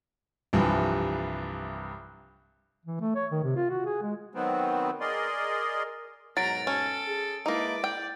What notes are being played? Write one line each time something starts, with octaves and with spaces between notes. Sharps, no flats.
C2 G2 E3 F3
E3
A3
C#5
D#3
C3
F4
F#4
G#4
G#3
D#3 F#3 B3 C4
G#4 A#4 D5 D#5 C6
G#2 B2 F#3 A#4 A#5 A6 D7
C#4 A4
G#4
G#3 A#3 D#4 E4 B4 D6
D5 G5